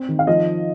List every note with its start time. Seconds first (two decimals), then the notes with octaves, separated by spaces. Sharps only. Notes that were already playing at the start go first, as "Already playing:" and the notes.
Already playing: C4
0.09 D#3
0.19 F5
0.27 F3 D#5